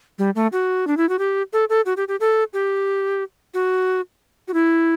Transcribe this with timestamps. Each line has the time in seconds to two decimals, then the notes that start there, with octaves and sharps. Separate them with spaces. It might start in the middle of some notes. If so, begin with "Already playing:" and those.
0.19 G3
0.35 A3
0.53 F#4
0.87 D4
0.97 E4
1.09 F#4
1.19 G4
1.53 A4
1.69 A4
1.86 F#4
1.97 G4
2.08 G4
2.20 A4
2.54 G4
3.54 F#4
4.48 F#4
4.54 E4